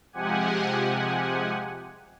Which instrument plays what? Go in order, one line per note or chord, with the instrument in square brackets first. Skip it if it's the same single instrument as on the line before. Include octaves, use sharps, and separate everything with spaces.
[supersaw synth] C3 F3 G#3 G4 F#5 G#5